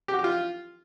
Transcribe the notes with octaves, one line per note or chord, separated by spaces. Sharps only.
G4
F#4
G4
F4